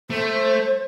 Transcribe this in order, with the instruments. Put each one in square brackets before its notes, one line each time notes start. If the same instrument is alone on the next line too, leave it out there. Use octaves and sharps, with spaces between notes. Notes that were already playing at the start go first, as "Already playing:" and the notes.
[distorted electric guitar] A3 [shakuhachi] C5